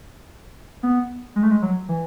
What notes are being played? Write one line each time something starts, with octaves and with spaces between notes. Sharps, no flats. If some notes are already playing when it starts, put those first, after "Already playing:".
B3
G#3
A3
G#3
F#3
E3